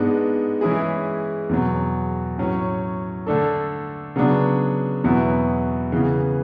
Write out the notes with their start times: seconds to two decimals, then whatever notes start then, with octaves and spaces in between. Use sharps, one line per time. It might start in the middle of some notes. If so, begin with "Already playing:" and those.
Already playing: G#2 G#3 B3 D4
0.61 E3 G#3 C#4 E4 G#4
1.49 E2 B2 F#3
2.38 A2 F#3 C#4
3.27 D3 A3 D4 A4
4.16 C#3 F#3 B3 D4
5.04 E2 B2 F#3 B3 E4
5.92 C#3 E3 B3